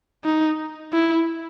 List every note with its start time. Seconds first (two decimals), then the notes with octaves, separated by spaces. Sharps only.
0.24 D#4
0.93 E4